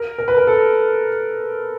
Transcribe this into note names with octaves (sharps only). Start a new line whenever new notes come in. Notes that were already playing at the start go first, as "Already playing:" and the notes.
Already playing: A#4
A#4
B4
A#4
A4